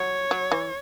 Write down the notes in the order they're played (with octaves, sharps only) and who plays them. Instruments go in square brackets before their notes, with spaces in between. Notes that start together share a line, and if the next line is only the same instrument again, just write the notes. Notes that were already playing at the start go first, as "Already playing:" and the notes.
Already playing: [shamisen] F#3 [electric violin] C#5
[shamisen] F#3
E3